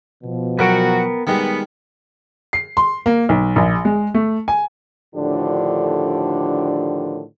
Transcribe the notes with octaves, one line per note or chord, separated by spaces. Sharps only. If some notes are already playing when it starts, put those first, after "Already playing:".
B2 F3
F#3 B3 F#4 A#4 G5
D#3 G3 G#3 B3
C7
C6
A#3
B1
A#1
G#3
A3
G#5
A2 D3 D#3 F3 D4 G4